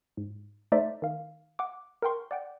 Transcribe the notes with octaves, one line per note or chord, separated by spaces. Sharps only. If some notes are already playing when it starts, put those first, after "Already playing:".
G#2
A3 D#4 C5 D5 E5
D#3 F5
F#5 D6
A#4 F#5 G5 C6 C#6
D5 F#5 G5